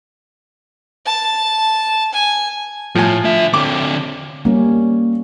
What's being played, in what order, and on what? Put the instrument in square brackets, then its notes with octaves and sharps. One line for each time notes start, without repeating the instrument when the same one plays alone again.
[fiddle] A5
G#5
[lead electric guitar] A2 [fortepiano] F3 G#5
[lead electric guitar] D3 E5
[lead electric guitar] D3 C4 [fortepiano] D6
[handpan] G3 C#4 [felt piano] A#3